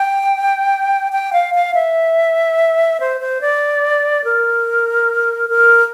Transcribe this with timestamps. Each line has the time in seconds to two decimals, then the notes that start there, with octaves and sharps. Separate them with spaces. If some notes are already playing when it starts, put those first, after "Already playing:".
Already playing: G5
1.12 G5
1.33 F5
1.54 F5
1.75 E5
3.00 C5
3.21 C5
3.41 D5
4.24 A#4
5.49 A#4